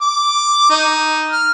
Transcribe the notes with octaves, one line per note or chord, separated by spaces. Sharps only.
D6
D#4
F6